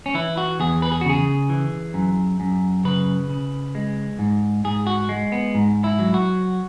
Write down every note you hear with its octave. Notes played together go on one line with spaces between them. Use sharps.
C#4
E3 E4
F#4
E2 G#4
B4
G#4
F#4
C#3 G#4
E3
F#2
F#2
C#3 B4
C#3
G#3
G#2
G#2 G#4
F#4
G#3
B3
G#2
E4
F#3
F#4